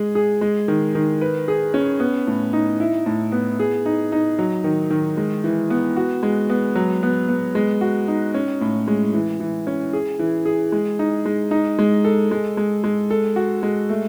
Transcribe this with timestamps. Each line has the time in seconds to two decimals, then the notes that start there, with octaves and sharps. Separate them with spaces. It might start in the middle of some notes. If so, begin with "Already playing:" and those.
Already playing: G#3 G#4
0.15 G#4
0.41 G#3
0.68 D#3
0.95 D#3
1.21 B4
1.48 G#4
1.74 C#4
2.00 B3
2.27 A2
2.53 D#4
2.80 E4
3.06 A2
3.32 B3
3.60 G#4
3.86 D#4
4.12 D#4
4.39 F#3
4.64 D#3
4.90 D#3
5.17 G#3
5.44 E3
5.70 B3
5.97 F#4
6.23 G#3
6.50 B3
6.75 F#3
7.03 B3
7.29 B3
7.55 G#3
7.81 F#4
8.08 D#4
8.34 C#4
8.61 A2
8.88 G#3
9.14 E3
9.40 E3
9.67 C#4
9.93 G#4
10.19 E3
10.45 G#4
10.72 G#3
10.99 D#4
11.25 G#3
11.51 D#4
11.79 G#3
12.05 A4
12.31 G#3
12.57 G#3
12.84 G#3
13.10 A4
13.36 F#4
13.63 G#3
13.89 A3